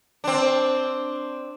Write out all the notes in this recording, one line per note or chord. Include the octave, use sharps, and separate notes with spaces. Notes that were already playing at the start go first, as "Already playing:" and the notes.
C4 D4